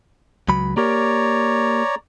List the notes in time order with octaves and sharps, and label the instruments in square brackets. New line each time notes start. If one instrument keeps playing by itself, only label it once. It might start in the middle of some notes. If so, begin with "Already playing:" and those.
[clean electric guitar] C#2 F#3 B5
[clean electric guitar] A#3 G4 A#4 [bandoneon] C#5 D5 A#5